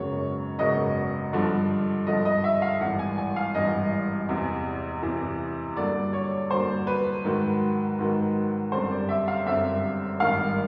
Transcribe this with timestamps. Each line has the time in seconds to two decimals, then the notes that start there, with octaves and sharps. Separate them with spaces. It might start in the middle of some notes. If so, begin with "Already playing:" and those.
Already playing: G#1 F#2 C#3 F#3 B3 C#5
0.59 G#1 F#2 C#3 F#3 B3 D#5
1.33 G2 D3 F3
2.07 G2 D3 F3 D#5
2.25 D#5
2.44 E5
2.62 F5
2.81 G#1 G2 E3 F#5
2.99 G#5
3.18 G#5
3.36 F5
3.55 G#1 G2 E3 D#5
4.29 E2 C3 E3
5.02 E2 C3 E3
5.76 G2 D3 F#3 A#3 D5
6.13 C#5
6.50 G2 D3 F#3 A#3 C5
6.87 B4
7.24 G#2 D#3 F#3
7.99 G#2 D#3 F#3
8.72 G1 F#2 D3 G3 C4 C5
8.91 D5
9.09 E5
9.28 F5
9.46 G1 F#2 D3 G3 C4 E5
10.20 G#1 G2 D#3 F5